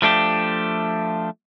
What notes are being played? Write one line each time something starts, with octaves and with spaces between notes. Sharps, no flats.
F3 A3 D4 G4